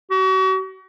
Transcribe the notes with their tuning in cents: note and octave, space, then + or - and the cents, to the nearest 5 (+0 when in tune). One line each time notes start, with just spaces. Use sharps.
F#4 +40